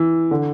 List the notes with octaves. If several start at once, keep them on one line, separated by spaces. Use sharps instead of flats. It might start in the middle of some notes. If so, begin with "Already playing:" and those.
Already playing: E3
D3